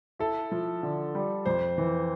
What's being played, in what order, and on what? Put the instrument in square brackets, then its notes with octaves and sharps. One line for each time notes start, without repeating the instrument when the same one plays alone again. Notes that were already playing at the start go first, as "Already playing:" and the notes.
[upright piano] E4 [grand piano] A4
[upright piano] F3
D3
G3
[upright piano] F2 [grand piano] C5
[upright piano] E3